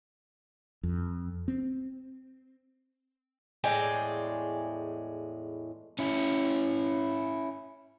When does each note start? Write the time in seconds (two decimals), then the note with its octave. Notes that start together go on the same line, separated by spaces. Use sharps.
0.83 F2
1.48 C4
3.64 E2 A2 G#3 D5 G5 G#5
5.99 C#4 E4